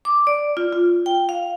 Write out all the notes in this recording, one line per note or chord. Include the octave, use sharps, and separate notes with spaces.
D6
D5
F4
F4
G5
F5